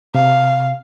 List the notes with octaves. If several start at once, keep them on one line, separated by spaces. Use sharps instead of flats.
C3 F5